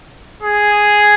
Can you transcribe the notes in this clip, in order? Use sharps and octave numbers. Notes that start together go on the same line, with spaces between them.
G#4